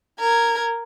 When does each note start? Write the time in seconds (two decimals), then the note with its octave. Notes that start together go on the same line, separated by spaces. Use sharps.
0.19 A#4 G#6